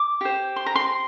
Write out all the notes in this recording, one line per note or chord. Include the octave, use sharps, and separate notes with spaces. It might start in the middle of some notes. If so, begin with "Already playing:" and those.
Already playing: D6
G4 C5
C6
A#5
C6